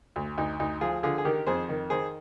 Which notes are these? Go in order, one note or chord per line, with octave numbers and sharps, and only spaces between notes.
D2
D2 D#4
D2 D#4
F3 F4 G#4
D3 F4 G#4
G#4
D#3 G4 A#4
F2 G#4 C5
D#3
D#3 G#4 C5